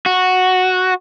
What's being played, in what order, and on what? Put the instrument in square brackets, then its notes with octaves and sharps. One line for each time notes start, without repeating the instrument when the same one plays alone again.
[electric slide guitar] F#4